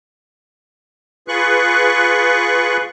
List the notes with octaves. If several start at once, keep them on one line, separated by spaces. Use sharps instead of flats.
F4 G#4 B4 C#6 F#6